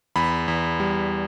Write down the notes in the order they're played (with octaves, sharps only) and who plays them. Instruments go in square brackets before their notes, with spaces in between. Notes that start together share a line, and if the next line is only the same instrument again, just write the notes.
[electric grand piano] E2 B5
E2
G3